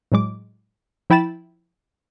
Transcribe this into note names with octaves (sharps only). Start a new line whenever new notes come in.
A2 F#3 G#3 D6
F3 E4 G5 B5 A6 E7